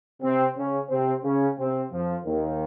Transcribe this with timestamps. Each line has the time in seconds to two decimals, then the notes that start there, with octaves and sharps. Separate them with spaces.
0.22 C3 C4
0.57 C#3 C#4
0.90 C3 C4
1.24 C#3 C#4
1.59 C3 C4
1.92 F2 F3
2.26 D#2 D#3